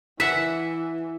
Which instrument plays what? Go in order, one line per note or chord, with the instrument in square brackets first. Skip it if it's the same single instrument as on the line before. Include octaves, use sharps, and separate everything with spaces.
[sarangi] E3 [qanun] E5 F#5 [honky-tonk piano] B6